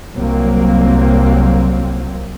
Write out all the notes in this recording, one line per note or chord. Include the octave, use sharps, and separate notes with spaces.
C2 F#3 A#3 C4